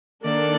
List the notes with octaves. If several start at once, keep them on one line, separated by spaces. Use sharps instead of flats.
D#3 A#3 D4 A4 D5